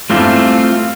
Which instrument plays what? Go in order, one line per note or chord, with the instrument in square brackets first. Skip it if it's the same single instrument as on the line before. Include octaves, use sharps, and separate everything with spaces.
[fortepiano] E2 G2 [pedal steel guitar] A3 C4 A4 [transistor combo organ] F4